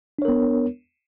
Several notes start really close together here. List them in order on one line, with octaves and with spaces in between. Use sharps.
D4 C#5 A#4 B3